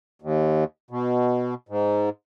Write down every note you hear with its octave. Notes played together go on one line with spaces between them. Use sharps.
D#2
B2
G#2